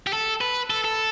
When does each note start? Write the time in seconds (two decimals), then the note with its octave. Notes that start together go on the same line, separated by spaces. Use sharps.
0.07 G4
0.13 A4
0.41 B4
0.70 A4
0.84 A4